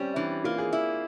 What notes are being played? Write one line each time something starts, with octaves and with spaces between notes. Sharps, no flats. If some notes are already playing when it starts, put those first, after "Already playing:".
Already playing: G3 C4 C#4
E3 D4
A#3 F4
G#4
E4